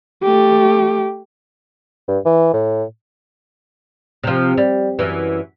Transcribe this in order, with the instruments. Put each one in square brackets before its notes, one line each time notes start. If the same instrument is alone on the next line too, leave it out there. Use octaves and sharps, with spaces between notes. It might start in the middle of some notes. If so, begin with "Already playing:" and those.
[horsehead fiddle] A3 G4
[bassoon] G2
E3
A2
[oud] C3 F3
G3
F#2 E3